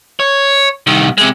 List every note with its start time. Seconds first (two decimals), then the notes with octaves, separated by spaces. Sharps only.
0.20 C#5
0.87 C2 D#3
1.18 C3 G#3